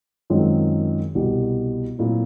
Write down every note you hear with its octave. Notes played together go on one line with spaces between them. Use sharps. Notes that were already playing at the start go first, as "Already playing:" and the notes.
F#2 D#3 G#3 C4 F4
C2 B2 G3
A#2 F#3 A3 C4 E4